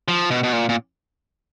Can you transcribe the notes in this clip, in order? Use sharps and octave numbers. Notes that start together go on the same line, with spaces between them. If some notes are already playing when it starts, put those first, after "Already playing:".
F3
B2
B2
A#2
A#2